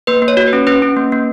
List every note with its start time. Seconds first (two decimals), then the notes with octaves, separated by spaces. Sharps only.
0.07 A#3 B4
0.22 A#3
0.28 C#5
0.37 F#4
0.47 B4
0.53 C#4
0.67 C#4 B4
0.82 C#4
0.97 A#3
1.12 A#3